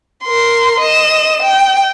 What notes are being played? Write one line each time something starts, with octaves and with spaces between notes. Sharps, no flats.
A#4 C6
D#5 E7
G5